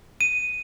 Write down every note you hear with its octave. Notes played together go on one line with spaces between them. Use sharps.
D#7